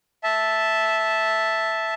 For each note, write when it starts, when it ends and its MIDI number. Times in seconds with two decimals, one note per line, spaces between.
0.24 1.94 76
0.24 1.94 81